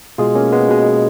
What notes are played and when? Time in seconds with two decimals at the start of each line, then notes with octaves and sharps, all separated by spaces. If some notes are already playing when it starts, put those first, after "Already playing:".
0.18 B2 G#3 F4 G#4
0.35 A#3 C#4
0.53 G#3 B3
0.69 B2 G#3